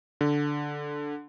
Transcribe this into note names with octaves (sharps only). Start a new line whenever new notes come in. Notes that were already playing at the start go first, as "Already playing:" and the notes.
D3